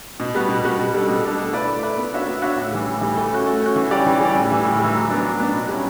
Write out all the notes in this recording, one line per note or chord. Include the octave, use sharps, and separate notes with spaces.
B2
G3 B3 F#4
B2
G3 B3 F#4
B2
G3 D4 A4
B2
G3 D4 A4
A3
E4 B4 D5
A3
E4 B4 D5
B3
D4 F#4 C#5 E5
B3
D4 F#4 C#5 E5
A2
E3 G3
A2
E3 G3
A3
C#4 F#4
A3
C#4 F#4
E3
G3 C#4 G4 D5
E3
G3 C#4 G4 D5
A2
E3 G3
A2
E3 G3
F#3
B3 D4
F#3
B3 D4
B2
G3 C#4 E4